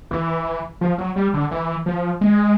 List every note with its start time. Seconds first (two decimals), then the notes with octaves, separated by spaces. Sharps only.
0.11 E3
0.81 F3
0.98 F#3
1.16 G3
1.34 D3
1.51 E3
1.86 F3
2.21 G#3